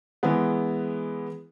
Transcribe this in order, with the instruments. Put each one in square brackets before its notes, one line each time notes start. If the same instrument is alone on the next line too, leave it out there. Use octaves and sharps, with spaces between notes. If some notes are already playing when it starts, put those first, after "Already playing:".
[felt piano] E3 G#3 B3